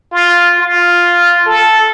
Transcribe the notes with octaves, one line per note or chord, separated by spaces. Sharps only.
F4
F4
A4